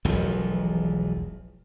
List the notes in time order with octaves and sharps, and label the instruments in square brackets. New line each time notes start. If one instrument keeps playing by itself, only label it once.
[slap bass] E1 B1 E2 F3